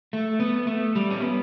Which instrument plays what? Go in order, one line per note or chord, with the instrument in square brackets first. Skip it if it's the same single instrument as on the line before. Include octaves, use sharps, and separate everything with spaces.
[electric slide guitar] A3
B3
A3
G3
C#4
B3